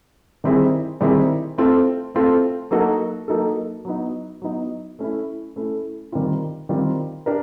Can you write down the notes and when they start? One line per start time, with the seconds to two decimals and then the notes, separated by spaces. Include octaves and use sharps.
0.44 D#3 G3 C4 E4 G#4
1.01 D#3 G3 C4 E4 G#4
1.58 A3 C4 F4 A4
2.15 A3 C4 F4 A4
2.71 F#3 A#3 D#4 F#4 A4
3.28 F#3 A#3 D#4 F#4 A4
3.85 F#3 B3 D#4
4.42 F#3 B3 D#4
4.99 A3 C#4 E4
5.56 A3 C#4 E4
6.12 D#3 G3 C4 F4
6.69 D#3 G3 C4 F4
7.26 D4 G4 A#4